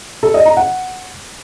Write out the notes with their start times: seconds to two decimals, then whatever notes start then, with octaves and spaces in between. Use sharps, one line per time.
0.23 A4
0.34 D#5
0.45 A#5
0.57 F#5